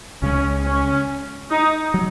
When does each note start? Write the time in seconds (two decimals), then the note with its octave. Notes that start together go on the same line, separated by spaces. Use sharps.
0.22 C#2 C#3 G#3 C#4
0.65 C#4
1.50 D#4
1.94 F#3